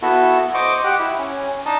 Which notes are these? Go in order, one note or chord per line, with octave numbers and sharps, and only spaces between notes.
B3 E4 F#4 A4
C5 D#5 C#6 D6
G4 F#5
E4
C#4
D4 D#4 D#5 A5